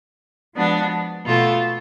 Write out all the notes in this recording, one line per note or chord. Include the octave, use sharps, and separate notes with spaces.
F3 G#3 B3 D4 F#4
B2 A3 F4 A4